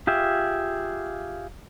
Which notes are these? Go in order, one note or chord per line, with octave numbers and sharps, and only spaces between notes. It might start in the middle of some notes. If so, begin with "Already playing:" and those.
F4 G4 G#4 E5